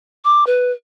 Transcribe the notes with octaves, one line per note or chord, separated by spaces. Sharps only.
D6
B4